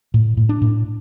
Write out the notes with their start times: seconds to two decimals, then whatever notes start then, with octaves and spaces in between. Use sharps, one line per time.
0.14 A2
0.37 A2
0.49 D4
0.62 A2